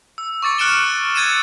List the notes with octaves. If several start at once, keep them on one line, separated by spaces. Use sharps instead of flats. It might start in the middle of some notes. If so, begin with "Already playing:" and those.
E6
C#6 D6 A6 C#7
F6 F#6 C#7 D7 E7 G7
E6 G#6 A6 C#7 D#7 E7